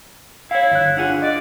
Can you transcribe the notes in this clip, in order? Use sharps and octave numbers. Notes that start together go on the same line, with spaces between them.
E4 C#5 F5
G1 F#6
D4 F4 G#4 F#5
D5 D#5